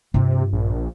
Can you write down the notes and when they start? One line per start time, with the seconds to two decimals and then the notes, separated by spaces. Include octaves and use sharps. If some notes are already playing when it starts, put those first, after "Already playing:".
0.14 G2 C3 F4
0.53 A#1